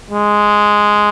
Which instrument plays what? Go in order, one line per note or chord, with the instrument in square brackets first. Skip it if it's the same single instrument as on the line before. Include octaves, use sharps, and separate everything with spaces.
[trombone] G#3